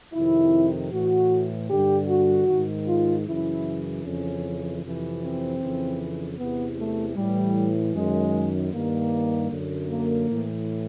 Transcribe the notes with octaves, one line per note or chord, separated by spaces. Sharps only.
F2 C3 D#3 E4
A2 E3 F#4
G2 D3 G4
F#4
G#2 D#3
F4
F#2 C#3 E3 E4
F2 C#3 E3 C#4
F2 C3 E3
C4
F2 C#3 E3
E2 C3 E3 B3
A3
A2 E3 G3
F#2 D#3 G#3
G2 D#3 A#3
F#2 D3
A#3
A2 E3